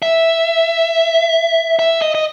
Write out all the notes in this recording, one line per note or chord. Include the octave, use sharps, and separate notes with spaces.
E5
E5
D#5
D#5